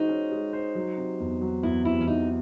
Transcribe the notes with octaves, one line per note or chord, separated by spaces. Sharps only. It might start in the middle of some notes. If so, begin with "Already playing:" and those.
Already playing: G#3 D#4 F#4 C5
C#4
G#3
C5
F#3
C3
E2
F#3
E2 E4
C3 E4
C#4
F#3 D#4